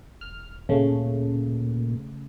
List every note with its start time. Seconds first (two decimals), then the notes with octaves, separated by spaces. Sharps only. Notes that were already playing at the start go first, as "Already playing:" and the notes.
0.21 E1 F6
0.69 D2 A#2 C#3 A3